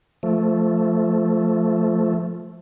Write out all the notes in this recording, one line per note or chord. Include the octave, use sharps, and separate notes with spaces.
F3 A3